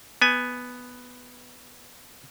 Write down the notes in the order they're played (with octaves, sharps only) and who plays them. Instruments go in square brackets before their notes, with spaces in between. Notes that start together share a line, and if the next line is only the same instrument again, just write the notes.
[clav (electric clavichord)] B3 G#5